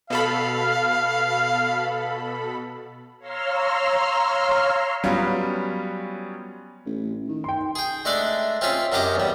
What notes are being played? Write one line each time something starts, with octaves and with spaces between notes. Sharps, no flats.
B2 A4 F5 B5
C#5 F5 A#5 C6 E6 F6
F#3 G3 B3 C#4 F4
A1
D#3
G5 C6
G#4 G5
G#3 A3 D4 A4 D5
C4 C#4 F4 G#4 E5
F#2 F#3 C#4 G4 D#5 D6
E2 G3